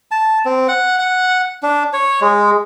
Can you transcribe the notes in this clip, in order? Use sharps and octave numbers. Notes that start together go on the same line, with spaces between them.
A5
C4
F#5
F#5
D4
C#5
G#3